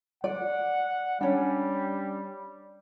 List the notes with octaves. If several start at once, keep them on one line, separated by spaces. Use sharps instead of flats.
D5 F#5
G3 C#4 D4